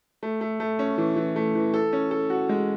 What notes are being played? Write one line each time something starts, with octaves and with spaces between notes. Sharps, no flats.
A3
A3
A3
C#4
E3
E3
A3
E3
A4
C#4
A4
F#4
G#3